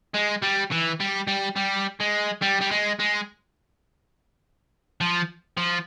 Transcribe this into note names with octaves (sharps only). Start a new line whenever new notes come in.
G#3
G3
E3
G3
G3
G3
G#3
G3
G3
G#3
G#3
F3
F3